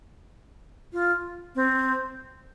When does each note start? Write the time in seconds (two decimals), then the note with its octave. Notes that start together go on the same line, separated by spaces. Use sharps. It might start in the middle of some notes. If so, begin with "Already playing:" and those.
0.93 F4
1.55 C4